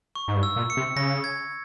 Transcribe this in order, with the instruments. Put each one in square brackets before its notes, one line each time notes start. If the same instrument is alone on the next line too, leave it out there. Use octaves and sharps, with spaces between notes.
[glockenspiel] C#6
[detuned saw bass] G#2
G2
[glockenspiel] E6
[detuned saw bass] A#2
[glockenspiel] C#7
[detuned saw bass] C3
[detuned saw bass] C#3 [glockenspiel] A#6
[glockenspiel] G#6